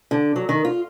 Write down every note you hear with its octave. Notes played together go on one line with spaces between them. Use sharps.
D3
F#3
D#3
F4